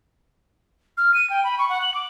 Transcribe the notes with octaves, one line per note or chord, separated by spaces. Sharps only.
F6
D#7
G5
B5
C#6
F#5
F#7
D6